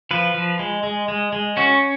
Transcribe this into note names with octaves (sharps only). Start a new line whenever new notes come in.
F3 B4
F3
G#3
G#3
G#3
G#3
C#4 F#4